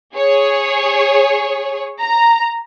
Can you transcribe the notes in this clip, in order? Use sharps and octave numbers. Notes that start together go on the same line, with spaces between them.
G#4 C#5
A#5